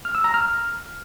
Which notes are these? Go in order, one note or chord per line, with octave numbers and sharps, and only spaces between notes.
F6
E6
A#5
F6